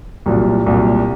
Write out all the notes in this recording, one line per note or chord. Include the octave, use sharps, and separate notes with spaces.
C2 A#2 F#3
C2 A#2 F#3